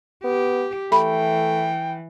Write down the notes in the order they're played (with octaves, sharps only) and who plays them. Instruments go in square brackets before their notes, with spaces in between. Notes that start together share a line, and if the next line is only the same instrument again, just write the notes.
[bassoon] B3 [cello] G4
[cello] E3 [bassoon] A3 [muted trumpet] G5 [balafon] B5